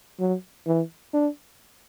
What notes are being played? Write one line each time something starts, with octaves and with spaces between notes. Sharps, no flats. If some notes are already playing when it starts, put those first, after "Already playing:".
F#3
E3
D4